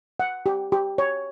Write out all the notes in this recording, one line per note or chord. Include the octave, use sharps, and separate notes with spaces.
F#5
G4
G4
C#5